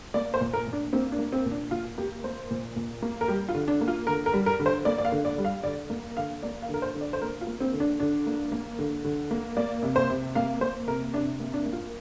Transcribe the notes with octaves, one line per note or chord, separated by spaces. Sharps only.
A#3 D5
C5
A#2
A#4
A#2
D4
A#3 C4
D4
A#3
C4
A#2
D4
A#2 F4
A#3 G4
A#3 C5
A#2
A#2
A#3
A#4
G3 G4
F4
D3
D4
A#3
F4
D3 A#4
A#4
G3
A#4
D3
C5
A#3 D5
D5
F5
D3
D5
G3
F5
D3 D5
A#3
D3 F5
A#3 D5
F5
D3
A#4
C5
D3
D5
C5
A#3 A#4
F4
A#3
C4
D3
D4
D3 D4
A#3
A#3
D3
D3
A#3
A#3 D5
C3
C5
C3
A#3 F5
A#3 C5
C3 A#4
C3 D4
A#3
D4
A#3
F4